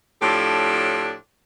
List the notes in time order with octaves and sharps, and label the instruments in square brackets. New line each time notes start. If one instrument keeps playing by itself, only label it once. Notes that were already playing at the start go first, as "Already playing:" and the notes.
[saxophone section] A2 F3 D4 G4 A4 C#5